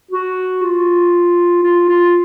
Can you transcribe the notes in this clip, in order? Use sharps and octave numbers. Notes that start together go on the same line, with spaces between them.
F#4
F4
F4
F4